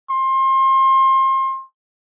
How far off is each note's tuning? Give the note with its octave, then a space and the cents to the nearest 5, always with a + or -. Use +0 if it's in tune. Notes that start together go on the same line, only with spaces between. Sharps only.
C6 +30